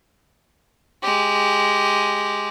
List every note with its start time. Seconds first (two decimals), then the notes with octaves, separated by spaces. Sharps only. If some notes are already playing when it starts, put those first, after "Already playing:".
1.03 G#3 G4